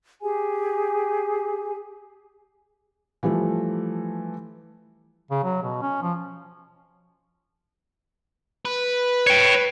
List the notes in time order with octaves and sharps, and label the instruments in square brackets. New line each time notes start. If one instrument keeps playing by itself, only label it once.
[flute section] G4 G#4 G#5
[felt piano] E3 F3 G3 A3
[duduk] C#3
F#3
B2
C#4
F3
[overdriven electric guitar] B4
[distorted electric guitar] C#5 G5